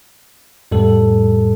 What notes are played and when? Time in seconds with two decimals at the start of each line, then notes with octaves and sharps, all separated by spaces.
0.71 F2 A2 G3 A4